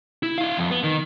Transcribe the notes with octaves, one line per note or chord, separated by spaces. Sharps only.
E4
E4 F5
F2
B3
D#3